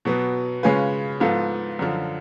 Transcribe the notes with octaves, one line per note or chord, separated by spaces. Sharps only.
B2 F#3 B3
C#3 G#3 C#4 F4 B4
G#2 F3 B3 F4 A4
F#2 D3 F3